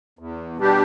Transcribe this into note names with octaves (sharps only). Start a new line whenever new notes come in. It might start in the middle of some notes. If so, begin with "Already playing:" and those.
E2
B2 G3 D4 G4